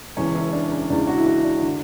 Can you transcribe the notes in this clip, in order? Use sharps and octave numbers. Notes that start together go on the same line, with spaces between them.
E1 E2 C#3 E3 C#4
E4
D4
C#4
E1 E2 C#3 E3 D4
F#4
E4
F#4
D4
D3